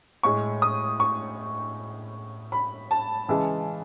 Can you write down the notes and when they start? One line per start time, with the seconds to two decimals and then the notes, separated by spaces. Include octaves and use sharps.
0.23 A2 G#3 C#6
0.62 D#6
1.00 C#6
2.52 B5
2.91 A5
3.28 C#3 E3 G#3